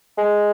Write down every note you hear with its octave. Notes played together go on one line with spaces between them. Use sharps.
G#3